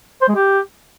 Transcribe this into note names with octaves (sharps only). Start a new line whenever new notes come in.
C5
G#3
G4